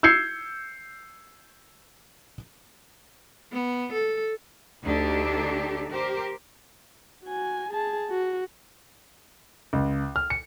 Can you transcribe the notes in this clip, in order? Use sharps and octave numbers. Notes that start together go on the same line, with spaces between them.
E6 G6 G#6 C7 C#7
B3
A4
D2 D4 D#4 G4 A4
G4 A#4 C5
F#4 G#5
G#4 A5
F#4
C#2
F6
C#7